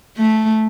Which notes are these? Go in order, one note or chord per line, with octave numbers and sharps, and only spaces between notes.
A3